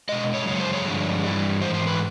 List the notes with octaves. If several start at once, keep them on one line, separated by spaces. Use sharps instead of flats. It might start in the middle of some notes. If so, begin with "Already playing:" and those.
B2 G#3 D#5
C#5
F#2 C#3 G#3 C#5
C5
C#5
G2 D3 F3 G#3
G2 E3 G3
G#2 E3 C5
C5
B4